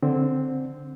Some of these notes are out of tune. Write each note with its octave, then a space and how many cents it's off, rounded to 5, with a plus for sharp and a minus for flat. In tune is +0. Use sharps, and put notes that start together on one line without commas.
D3 +0 C4 +0